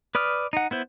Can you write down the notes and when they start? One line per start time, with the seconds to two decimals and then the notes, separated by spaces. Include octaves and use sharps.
0.15 B4 D5 D#6 F6
0.53 D#4 F#5
0.71 B3 E4 C5